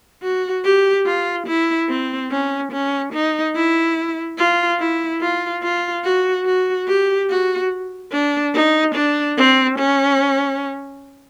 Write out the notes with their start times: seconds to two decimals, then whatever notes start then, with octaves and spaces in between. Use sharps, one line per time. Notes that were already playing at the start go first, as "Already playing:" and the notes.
0.23 F#4
0.64 G4
1.06 F4
1.47 E4
1.89 C4
2.31 C#4
2.72 C#4
3.13 D#4
3.55 E4
4.38 F4
4.79 E4
5.21 F4
5.63 F4
6.04 F#4
6.46 F#4
6.88 G4
7.30 F#4
8.12 D4
8.54 D#4
8.95 D4
9.38 C4
9.78 C#4